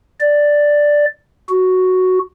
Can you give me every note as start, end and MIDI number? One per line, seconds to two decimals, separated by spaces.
0.21 1.05 74
1.49 2.19 66